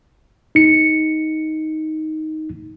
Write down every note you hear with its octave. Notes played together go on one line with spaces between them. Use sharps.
D#4 C#7